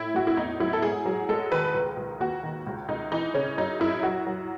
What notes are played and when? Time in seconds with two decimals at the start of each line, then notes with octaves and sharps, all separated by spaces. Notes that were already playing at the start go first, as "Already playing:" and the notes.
Already playing: A2 E4
0.14 A2 F#4
0.27 E4
0.37 E2 D#4
0.60 F#3 E4
0.73 A4
0.82 G#2 G#4
1.06 F#3
1.29 G#3 A4
1.52 D#3 B4
1.74 C#2
1.97 C#2
2.20 D#2 F#4
2.43 D#3
2.67 C#2
2.88 C#2 D#4
3.12 E3 D#4
3.34 C#3 C#4
3.58 F#2 D#4
3.80 F#2 E4
4.03 F#3 F#4
4.27 F#3